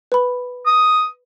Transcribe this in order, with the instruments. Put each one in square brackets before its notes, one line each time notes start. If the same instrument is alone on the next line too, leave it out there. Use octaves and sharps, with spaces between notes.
[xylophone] B4 B5
[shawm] D#6